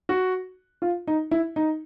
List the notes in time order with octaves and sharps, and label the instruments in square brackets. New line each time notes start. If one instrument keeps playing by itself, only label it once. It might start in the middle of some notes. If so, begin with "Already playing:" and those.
[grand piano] F#4
F4
D#4
E4
D#4